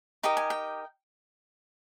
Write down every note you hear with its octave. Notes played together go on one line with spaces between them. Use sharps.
D#4 G4 A#4 D#5 G5
G#5
G5